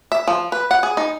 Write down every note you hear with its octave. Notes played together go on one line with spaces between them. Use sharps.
E5
F3
B4
F#5
G#4
D#4